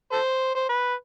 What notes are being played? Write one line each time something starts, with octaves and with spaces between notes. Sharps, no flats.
A4 C5
C5
B4